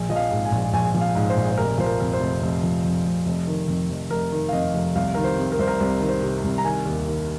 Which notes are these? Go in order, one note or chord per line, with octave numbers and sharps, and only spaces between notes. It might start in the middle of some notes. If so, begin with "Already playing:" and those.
Already playing: A#1
F3 D#5
F5
G#2
G#5
A#1
A#1 G#5
F3
F5
G#2
C5
A#1
C5
F1 A#4
F3 C5
A#4
F2
C5
F1
F1
F3
F2
F1
F1
D#3
F2
F1
F1 A#4
D#3
F5
F2 D#5
F1
C2 F5
D#3 A#4
C5
C3
A#4
C2 C5
A#4
C2 C5
D#3
C5
C3
C2
A#5
D#3 G#5
D#2
D#3